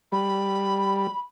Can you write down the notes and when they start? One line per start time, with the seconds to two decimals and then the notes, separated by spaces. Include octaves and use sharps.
0.12 G3 B5